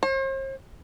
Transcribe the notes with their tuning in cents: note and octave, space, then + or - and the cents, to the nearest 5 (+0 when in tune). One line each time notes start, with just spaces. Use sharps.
C5 +45